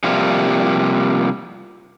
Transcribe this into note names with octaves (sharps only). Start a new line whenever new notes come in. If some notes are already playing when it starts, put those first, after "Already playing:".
C3 F3 G3 A#3